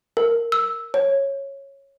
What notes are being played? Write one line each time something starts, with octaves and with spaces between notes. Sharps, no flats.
A#4
E6
C#5